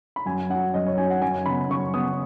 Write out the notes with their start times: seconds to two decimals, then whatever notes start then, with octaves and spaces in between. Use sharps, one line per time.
0.16 B5
0.26 F#2 G#5
0.49 F#3 C#4 F#5
0.74 F#2 D#5
0.86 C#5
0.98 F#3 C#4 G#5
1.10 F#5
1.22 F#2 G#5
1.46 C#3 B3 B5
1.70 F#2 C#6
1.94 C#3 B3 D#6